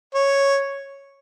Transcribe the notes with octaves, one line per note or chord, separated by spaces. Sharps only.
C#5